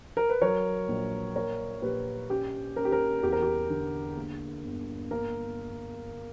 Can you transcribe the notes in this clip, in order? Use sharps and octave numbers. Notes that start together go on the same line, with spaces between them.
A#4
B4
F#3 A#4 C#5
A#1
A#3 A#4 C#5
A#1 G4 B4
C#4 G4
C#4 A#4
G4
A#4
E2 G4
A#4
G4
D3
A#3
G1
A#3 A#4